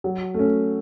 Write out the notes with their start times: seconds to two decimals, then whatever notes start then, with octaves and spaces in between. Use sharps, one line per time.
0.04 F#3
0.34 A3 C#4